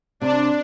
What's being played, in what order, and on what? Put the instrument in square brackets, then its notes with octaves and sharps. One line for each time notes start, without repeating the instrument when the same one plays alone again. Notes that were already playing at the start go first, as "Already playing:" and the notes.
[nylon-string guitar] C3 [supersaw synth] D4